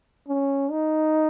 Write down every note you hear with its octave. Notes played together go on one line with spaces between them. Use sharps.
C#4
D#4